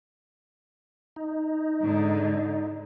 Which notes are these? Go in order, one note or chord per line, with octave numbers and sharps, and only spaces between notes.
D#4
G#2 D3